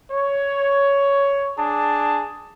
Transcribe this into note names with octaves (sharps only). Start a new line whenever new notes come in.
C#5
D4 G#4 A5